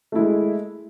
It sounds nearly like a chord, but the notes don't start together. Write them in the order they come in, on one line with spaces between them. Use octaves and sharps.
A3 E4 G#3